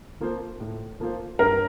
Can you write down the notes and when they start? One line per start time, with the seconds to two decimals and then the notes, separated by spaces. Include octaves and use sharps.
0.21 F3 A#3 F4 C5
0.60 A2
1.00 F3 A#3 F4 C5
1.39 G2 A#4